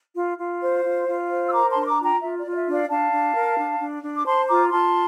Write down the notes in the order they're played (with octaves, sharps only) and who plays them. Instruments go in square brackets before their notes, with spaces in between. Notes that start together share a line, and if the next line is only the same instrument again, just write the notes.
[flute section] F4
F4
C5
F4
F4
C5
E6
A#4 A#5 D6
A5 C6
D4
C6
A#5 D6
F4
G5 A#5
F4 E5
D5
F4
D5
E5
D4
D5 F5
D4 F5 A5
D4
A#4
D4
D4
D4
D6
C5 A5 C6
F4 A#5 D6
F4 A5 C6